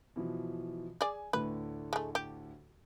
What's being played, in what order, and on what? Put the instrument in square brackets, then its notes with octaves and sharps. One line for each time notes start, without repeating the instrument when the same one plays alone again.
[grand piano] B2 E3 F3
[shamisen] G#4 D5 [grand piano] G#5
[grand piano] D2 A2 D3 [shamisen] B4
[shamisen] G#3 A3
G4